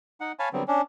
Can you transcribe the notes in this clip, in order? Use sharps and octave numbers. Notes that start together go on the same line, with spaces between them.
D#4 F#5
C#5 F5 G#5 A5 B5
D3 F#3 G3 B3 C4
C#4 D4